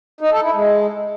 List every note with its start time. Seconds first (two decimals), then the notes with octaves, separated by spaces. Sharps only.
0.21 D#4
0.32 A4
0.43 E4
0.54 G#3